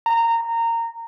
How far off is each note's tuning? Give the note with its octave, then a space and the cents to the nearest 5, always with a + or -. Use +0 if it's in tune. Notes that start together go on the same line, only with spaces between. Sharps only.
A#5 -20